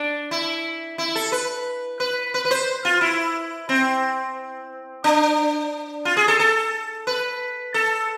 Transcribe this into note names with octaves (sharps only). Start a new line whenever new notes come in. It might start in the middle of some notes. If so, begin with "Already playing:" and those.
Already playing: D4
E4
E4
A4
B4
B4
B4
B4
C5
F4
E4
C4
D4
F4
G#4
A4
A4
B4
A4